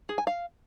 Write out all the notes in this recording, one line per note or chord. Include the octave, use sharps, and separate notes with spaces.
G#4
G#5
F5